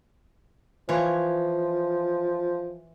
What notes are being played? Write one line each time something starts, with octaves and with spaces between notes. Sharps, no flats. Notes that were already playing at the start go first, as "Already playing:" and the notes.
E3 F3 F4 C#5